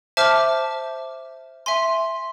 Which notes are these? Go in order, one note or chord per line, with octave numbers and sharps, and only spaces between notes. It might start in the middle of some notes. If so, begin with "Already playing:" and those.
C5 E5 A5 D6 F6
E5 G#5 C6